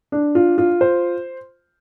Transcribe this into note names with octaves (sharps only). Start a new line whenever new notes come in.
D4
F4
F4
C5